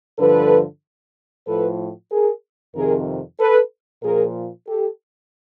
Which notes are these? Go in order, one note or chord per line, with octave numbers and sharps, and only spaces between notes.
G2 D3 F3 A4 B4
A2 F3 A4 B4
G#4 A#4
F2 C3 D#3 G#4 A#4
A4 B4
A#2 F3 G#4 A#4
G4 A4